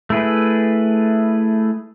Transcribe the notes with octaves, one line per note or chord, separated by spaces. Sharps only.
A3 E4 G#4 B4